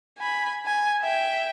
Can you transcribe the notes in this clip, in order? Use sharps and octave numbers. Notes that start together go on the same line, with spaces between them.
G#5 B5
G#5
E5 G5